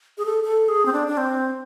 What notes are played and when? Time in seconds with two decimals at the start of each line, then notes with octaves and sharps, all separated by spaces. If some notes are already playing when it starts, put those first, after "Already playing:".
0.18 G#4
0.25 A4
0.44 A4
0.68 G#4
0.86 C4
0.93 D4
1.08 D4
1.17 C4